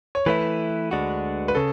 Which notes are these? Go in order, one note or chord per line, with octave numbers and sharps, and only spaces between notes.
C#5
E3 A3 E4 B4
D2 D3 G#3 D4 F#4
B4
C#3 A4